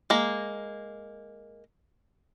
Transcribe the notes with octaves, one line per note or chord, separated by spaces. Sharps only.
G#3 A#3